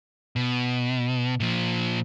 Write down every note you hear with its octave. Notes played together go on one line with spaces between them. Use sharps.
B2
A#2 F3